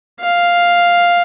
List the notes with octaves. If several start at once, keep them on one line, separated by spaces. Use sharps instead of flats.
F5